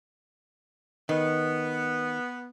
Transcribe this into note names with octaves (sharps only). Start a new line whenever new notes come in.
D#3 B3